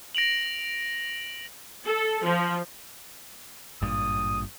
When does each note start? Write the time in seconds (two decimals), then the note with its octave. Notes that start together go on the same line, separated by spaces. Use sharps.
0.15 A#6 D7 F7 F#7
1.85 A4
2.25 F3
3.81 G#1 G2 A#2 D#6